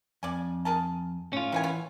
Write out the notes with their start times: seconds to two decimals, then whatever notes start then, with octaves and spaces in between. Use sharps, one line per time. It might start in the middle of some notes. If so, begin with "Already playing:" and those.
0.23 F2 D5 G#5
0.65 G#4 A#4 A5
1.33 A2 C#4 F4
1.52 D#3 E3 B3 G#5
1.64 B3